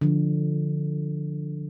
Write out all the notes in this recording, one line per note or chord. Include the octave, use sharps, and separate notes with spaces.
D3 F3